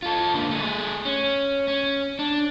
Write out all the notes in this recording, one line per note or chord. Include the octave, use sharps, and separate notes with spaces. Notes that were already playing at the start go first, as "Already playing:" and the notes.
F4 A4
D3 A#3
A3 G#4
C#4
C#4
D4